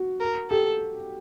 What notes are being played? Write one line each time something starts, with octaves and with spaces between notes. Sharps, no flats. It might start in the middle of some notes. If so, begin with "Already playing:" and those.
Already playing: F#4
A#4
G4 A4